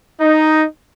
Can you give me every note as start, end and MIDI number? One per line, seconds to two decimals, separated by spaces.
0.21 0.64 63